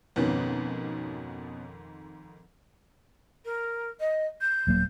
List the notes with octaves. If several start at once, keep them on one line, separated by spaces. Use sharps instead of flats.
F2 G#2 B2 D#3 B3 C#4
A#4
D#5
G6
D#1 F#3 A#3